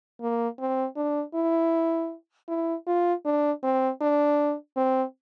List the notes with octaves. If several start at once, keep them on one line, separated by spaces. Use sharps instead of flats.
A#3
C4
D4
E4
E4
F4
D4
C4
D4
C4